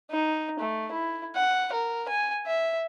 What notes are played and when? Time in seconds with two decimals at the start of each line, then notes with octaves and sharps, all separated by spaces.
0.11 D#4
0.60 A3
0.92 E4
1.36 F#5
1.73 A#4
2.09 G#5
2.47 E5